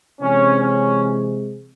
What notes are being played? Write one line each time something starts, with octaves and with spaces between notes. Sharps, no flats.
C3 E3 G#3 C4 C#4
C#4